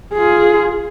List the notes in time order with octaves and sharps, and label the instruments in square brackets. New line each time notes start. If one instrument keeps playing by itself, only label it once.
[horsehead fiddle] F4 G#4